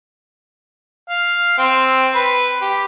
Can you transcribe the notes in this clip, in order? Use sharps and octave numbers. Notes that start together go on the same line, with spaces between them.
F5
C4
B4
G4